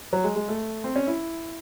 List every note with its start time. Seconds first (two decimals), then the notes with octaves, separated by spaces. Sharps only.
0.13 F#3
0.24 G#3
0.36 G#3
0.48 A3
0.84 C4
0.96 C#4
1.07 E4